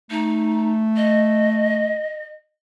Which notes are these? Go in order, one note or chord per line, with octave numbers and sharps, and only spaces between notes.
A3 D#4
D#5